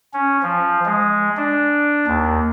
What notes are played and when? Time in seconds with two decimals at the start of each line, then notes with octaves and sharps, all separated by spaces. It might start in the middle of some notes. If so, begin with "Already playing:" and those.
0.14 C#4
0.43 F3
0.86 G#3
1.37 D4
2.07 D#2